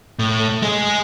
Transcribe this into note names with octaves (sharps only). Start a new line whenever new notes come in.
A2
G#3 G#4